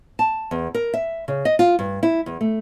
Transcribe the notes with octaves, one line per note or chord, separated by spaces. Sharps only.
A5
E2
A#4
E5
C#3
D#5
F4
G2
E4
E2
A3